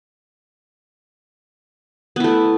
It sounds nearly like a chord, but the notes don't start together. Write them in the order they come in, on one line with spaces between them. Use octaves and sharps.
B3 E4 A3